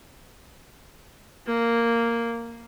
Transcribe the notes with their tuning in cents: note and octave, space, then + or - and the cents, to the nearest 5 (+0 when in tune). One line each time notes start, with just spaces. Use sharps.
A#3 -5